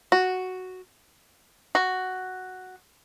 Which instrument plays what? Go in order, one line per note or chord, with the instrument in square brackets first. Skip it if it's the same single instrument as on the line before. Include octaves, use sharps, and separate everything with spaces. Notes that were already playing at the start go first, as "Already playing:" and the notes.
[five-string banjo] F#4
[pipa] F#4